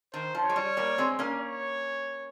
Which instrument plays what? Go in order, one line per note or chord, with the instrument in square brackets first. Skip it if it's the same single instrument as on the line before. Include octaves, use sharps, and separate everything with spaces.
[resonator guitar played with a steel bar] D#3 [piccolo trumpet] C5
[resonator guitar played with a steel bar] F3
[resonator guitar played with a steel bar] G#3 [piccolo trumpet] C#5
[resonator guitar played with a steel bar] G3
G3 A#3
G#3 C4
A#3 C#4
[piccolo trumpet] C#5